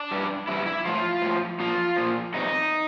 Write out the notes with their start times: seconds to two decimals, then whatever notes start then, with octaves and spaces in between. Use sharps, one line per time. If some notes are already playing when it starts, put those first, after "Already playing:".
Already playing: D4
0.11 G2 E3 G3
0.47 G2 E3 G3 E4
0.66 E4
0.85 A2 F3 F4
1.22 A2
1.27 F3
1.60 A#2 F3 F4
1.96 A#2 F3
2.34 E2 C3 D#4